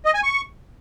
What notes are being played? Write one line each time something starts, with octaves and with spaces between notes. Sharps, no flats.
D#5
G#5
C#6